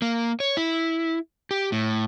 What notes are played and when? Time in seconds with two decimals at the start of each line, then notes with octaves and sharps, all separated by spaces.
0.02 A#3
0.40 C#5
0.57 E4
1.51 G4
1.72 A2